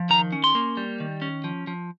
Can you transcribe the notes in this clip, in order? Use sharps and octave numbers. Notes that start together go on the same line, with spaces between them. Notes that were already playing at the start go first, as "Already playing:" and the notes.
Already playing: F3
D#3 A#5
C#4
C6
A#3
G3
D#3
C#4
F3
F3